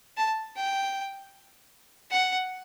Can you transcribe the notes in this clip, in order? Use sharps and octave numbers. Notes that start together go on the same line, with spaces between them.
A5
G5
F#5